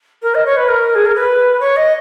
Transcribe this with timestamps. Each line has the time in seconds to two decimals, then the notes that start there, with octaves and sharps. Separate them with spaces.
0.22 A#4
0.35 D#5
0.45 C#5
0.57 B4
0.68 A#4
0.95 G#4
1.05 A#4
1.15 B4
1.60 C#5
1.76 D#5